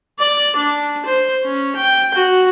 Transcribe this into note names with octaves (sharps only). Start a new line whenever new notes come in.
D5
D4
C5
C#4
G5
F#4